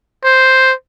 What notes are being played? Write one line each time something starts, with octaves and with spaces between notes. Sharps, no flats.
C5